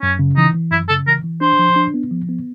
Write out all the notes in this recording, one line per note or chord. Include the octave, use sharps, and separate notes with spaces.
F#2 C#4
C#3
E3 D#4
E3
F#2 E4
C#3 A4
E3 A#4
E3
D4 C5
F3
D4
B3
F3
B3